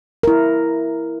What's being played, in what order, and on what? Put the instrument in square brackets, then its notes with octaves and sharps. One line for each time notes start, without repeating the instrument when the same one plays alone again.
[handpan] E4 A#4